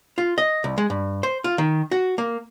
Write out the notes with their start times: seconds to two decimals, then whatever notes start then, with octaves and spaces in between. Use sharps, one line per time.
0.18 F4
0.38 D#5
0.64 C2
0.78 G#3
0.90 G2
1.23 C5
1.44 F4
1.58 D#3
1.91 F#4
2.18 A#3